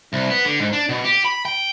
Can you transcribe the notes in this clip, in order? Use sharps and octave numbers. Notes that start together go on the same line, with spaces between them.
C2
B3
D3
G#2
D4
B2
G4
B5
G5